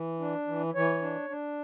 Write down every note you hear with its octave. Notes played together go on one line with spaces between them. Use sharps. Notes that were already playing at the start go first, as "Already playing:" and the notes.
Already playing: E3
D4
E3
E3 C#5
D4
D4